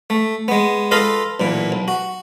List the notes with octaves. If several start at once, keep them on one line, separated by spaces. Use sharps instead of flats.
A3
G#3 B3
F4 A4 B4 D#5 F5
B1 A#2 E3
B1
F#4